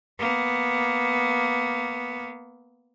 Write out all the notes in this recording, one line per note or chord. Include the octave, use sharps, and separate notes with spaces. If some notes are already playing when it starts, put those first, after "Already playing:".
A#3 B3